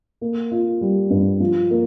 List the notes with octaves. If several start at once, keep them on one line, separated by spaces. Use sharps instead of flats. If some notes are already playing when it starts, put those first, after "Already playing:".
A#3
F4
G3
G2
F3
A#3